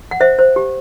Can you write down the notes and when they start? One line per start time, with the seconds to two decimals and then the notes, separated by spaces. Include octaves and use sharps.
0.11 F#5
0.20 C5 E5
0.39 C5
0.56 G4